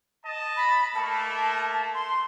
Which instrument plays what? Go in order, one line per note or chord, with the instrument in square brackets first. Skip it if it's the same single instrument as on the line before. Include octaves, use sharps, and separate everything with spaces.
[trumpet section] D#5 A5
[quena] B5
[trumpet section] A3 A#3 [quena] A5
[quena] C6